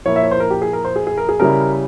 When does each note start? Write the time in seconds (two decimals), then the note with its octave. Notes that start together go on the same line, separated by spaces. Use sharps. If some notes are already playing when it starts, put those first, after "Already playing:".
0.06 A#2 F3 A#3 E4 C#5
0.16 E5
0.23 C#5
0.31 C5
0.40 A#4
0.50 G4
0.62 G#4
0.73 A#4
0.85 C5
0.96 G#4
1.07 G#4
1.18 A#4
1.29 G#4
1.40 C#3 G3 C#4 E4 A#4